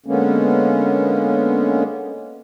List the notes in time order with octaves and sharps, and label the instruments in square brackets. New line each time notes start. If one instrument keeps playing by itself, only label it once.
[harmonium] D3 G#3 A#3 B3 C#4